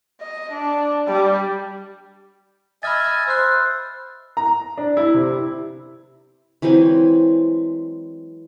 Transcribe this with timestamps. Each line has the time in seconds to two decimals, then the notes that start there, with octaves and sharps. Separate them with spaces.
0.21 D#5
0.52 D4
1.08 G3
2.83 D#5 E5 G#5 B5 F6 A6
3.00 F6
3.27 C5 E6 F#6
4.37 A#5
4.78 D4
4.97 E4
5.14 C3
5.32 E4
6.62 E3 F#3 G#3 C4